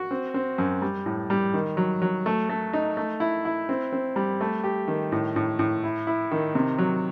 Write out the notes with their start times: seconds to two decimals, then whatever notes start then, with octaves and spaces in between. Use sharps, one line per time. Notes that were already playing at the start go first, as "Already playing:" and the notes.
Already playing: F#4
0.11 C4
0.34 C4
0.58 F#2
0.82 G3
1.06 A2
1.30 G3
1.54 D#3
1.77 F#3
2.02 F#3
2.26 A3
2.49 A3
2.73 D#4
2.97 A3
3.20 E4
3.45 E4
3.69 C4
3.93 C4
4.16 G3
4.41 A3
4.64 G4
4.88 D#3
5.12 A2
5.36 A2
5.59 A2
5.84 E4
6.07 E4
6.31 D#3
6.55 C3
6.78 F#3